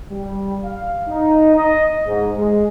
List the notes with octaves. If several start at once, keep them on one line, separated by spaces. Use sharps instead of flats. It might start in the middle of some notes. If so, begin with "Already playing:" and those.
G3
F5
D#4
D#5
G#2
G#3